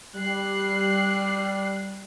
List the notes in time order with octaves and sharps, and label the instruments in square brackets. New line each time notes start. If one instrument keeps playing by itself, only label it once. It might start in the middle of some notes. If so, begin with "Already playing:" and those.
[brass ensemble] G3 [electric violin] F#6 C7